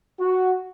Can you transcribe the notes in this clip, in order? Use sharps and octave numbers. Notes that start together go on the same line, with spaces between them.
F#4